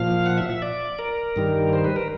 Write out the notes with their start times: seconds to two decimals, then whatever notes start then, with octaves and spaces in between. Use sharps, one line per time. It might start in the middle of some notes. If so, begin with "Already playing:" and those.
Already playing: A#2 F3 F5
0.26 F#5
0.38 E5
0.50 E5
0.62 D5
0.99 A#4
1.36 G2 D#3 G3
1.73 C5
1.85 B4
1.96 A#4